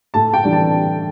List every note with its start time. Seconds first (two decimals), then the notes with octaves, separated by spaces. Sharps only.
0.14 A2 A5
0.33 G5
0.44 E3 G3 D4
0.53 A5